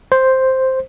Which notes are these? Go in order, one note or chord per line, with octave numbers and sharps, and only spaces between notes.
C5